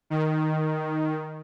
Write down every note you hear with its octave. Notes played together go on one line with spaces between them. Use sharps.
D#3